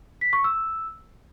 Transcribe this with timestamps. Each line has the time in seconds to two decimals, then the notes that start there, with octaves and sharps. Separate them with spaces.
0.21 B6
0.33 C#6
0.44 E6